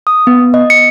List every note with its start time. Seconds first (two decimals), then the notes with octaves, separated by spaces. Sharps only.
0.07 D#6
0.27 B3
0.54 D#5
0.70 C#7